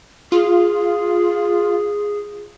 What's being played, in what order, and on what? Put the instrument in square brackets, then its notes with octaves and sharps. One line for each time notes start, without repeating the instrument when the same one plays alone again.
[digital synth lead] F4 [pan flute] G#4